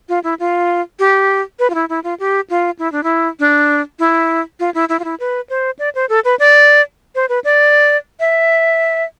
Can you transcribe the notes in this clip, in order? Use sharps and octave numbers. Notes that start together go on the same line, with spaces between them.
F4
E4
F4
G4
B4
F4
E4
E4
F4
G4
F4
E4
D4
E4
D4
E4
F4
E4
E4
F4
E4
B4
C5
D5
C5
A4
B4
D5
C5
B4
D5
E5